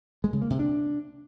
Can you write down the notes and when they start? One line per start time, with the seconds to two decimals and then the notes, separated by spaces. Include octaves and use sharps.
0.24 G#3
0.33 C#3
0.42 A#3
0.50 C3
0.59 D4